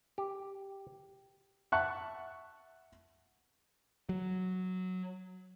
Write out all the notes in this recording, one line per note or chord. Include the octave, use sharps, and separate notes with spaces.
G4
E5 F#5 A5 C#6 F#6
F#3